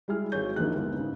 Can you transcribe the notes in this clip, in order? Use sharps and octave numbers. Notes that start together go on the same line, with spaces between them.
G3 G#3 E4 G#4 F6
G#1 F#3 G#3 G#4 C#5 G6
A#1 D#2 F3 A#3 D#4 F#6
G1 D#2 G#3 B3 E4
G#2 C#3